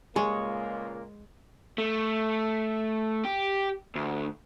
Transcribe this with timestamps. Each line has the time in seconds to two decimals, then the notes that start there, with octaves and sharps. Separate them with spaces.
0.16 C#2 A#2 G#3 A#3 G#4 C#5
1.78 A3
3.24 G4
3.95 D2